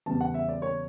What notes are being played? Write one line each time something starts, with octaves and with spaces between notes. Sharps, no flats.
E2 C#3 G3 A5
F#5
E5
D5
C#5